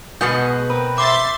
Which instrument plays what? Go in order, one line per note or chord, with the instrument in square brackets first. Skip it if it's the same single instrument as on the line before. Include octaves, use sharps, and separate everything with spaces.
[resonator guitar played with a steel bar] B2 B3 F#4 [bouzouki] G#3 G#4 D#5 [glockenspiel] G6
[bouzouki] C4 A#4 B4
[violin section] E5 C6 A6 [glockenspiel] D6